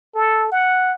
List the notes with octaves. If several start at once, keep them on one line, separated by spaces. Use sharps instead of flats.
A4
F#5